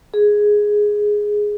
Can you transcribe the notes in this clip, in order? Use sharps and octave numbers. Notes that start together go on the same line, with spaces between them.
G#4